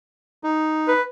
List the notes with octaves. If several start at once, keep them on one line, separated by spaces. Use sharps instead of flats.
D#4
B4